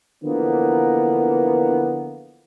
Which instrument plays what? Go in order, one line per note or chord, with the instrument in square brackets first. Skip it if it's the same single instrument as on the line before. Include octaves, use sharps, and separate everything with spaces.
[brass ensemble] D3 E3 F3 A#3 B3